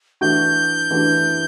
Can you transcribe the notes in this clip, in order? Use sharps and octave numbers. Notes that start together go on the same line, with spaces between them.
E3 A3 D4 F#4 G6
E3 A3 D4 F#4